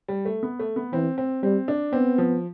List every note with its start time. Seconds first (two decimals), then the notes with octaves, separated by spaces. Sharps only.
0.08 G3
0.25 A3
0.43 B3
0.59 A3
0.76 B3
0.93 E3 C4
1.18 C4
1.43 G3 C4
1.68 D4
1.93 B3 C4
2.18 F3